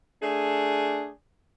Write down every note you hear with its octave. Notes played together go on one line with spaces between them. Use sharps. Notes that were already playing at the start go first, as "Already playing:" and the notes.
A3 D4 G#4